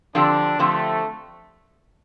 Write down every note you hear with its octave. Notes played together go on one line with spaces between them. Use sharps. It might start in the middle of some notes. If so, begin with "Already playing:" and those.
D3 F3 C4 D4 G4
D3 F3 A3 C4 G4